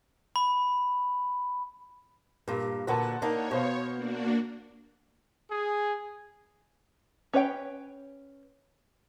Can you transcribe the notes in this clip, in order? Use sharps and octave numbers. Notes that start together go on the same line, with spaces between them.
B5
G2 A#2
A#2 D3 F#4 B4 F#5 A5
A#3 D4 D#4 C#5
B2 B3 C5 F5
A#3 D4 F#4
G#4
C#4 B4 C#5 F5 G5